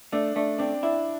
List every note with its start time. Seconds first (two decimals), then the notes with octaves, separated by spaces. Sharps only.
0.12 A3 D4
0.36 A3 D4
0.59 C4 D4
0.83 D4 E4